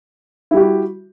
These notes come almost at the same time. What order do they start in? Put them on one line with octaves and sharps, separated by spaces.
E4 G3 G4 F#4